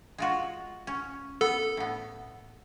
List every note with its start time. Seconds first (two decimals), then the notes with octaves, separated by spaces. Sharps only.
0.18 G#3 F4 F#4
0.87 C#4
1.41 B3 A4
1.77 A2 B3